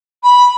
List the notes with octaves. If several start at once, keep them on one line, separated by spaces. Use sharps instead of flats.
B5